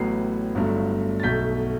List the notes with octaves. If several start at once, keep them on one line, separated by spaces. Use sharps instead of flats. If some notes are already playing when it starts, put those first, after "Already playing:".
Already playing: A1 A2 F#3 B3 C7
G1 G2 F#3 A3
A6
B1 B2 A3 G6 B6